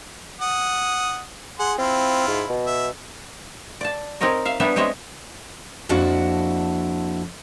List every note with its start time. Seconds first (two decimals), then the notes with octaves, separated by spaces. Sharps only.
0.41 F#5 D#6
1.59 G#4 F#5 C6
1.79 C4 E4 F4
2.28 G#2
2.49 B2
2.67 E5
3.81 D5 A5
4.21 C4 D#4 A#4 C#5 D#5
4.45 E5 F5
4.60 G3 B3 D4 G4 C#5 E5
4.76 G#3 C4 C#5 D#5 E5
5.89 F2 A#3 D4 E4 F#4 F#5